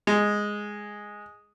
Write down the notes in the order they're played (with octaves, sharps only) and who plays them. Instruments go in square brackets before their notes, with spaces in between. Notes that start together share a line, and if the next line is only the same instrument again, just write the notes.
[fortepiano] G#3